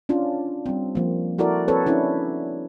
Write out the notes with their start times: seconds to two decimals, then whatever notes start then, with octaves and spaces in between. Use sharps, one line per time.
0.09 C#4 D4 F4
0.66 G3 C4
0.95 F3 A#3
1.38 E4 F#4 A4 A#4 D5
1.68 C4 A4 B4 C#5
1.86 C#4 D4 E4 A4